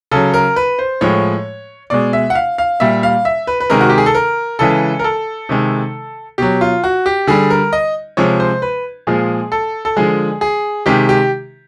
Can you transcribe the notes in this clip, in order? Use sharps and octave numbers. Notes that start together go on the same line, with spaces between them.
C#3 F#3 A4
A#4
B4
C5
A2 F3 G#3 C#5
B2 G#3 D5
E5
F#5
F5
F5
A#2 G3 E5
F5
E5
B4
B4
C3 D#3 G#3 A#4
F#4
G4
G#4
A4
A#4
C#3 E3 G#3 A4
A#4
A4
C3 D#3 G#3
B2 F#3 G4
F4
F#4
G4
D3 G3 G#4
A#4
D#5
C3 F3 G#3 C#5
C5
B4
A#2 F3 G#3 G#4
A4
A4
D3 F3 G#3 G#4
G#4
C3 D#3 G#3 G4
G4